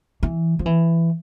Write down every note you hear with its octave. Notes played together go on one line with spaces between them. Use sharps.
E3
F3
E3